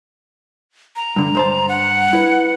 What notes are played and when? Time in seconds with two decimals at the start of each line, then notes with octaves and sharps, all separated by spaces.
0.96 A#5
1.16 G2 D3
1.35 G2 C5 A5
1.69 F#5
2.13 E4 B4